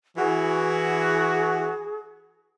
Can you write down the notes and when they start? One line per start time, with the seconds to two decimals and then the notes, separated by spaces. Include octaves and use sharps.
0.18 E3 F#4 G#4